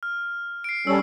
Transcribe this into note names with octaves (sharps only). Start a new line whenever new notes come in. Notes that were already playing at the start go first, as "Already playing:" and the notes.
F6
C7 D7
G3 C#4 A4 E6